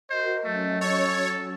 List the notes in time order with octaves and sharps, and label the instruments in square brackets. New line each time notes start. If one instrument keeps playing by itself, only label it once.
[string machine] F#4 A#4 [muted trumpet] C5 [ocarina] D#5
[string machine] F#3 C#4 [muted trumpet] A3
[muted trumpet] A4 [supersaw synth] C#5